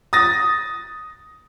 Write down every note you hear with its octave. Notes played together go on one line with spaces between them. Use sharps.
D#6 A6 A#6